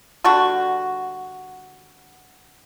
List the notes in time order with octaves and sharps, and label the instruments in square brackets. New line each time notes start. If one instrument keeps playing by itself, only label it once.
[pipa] D3 G3 D4 F#4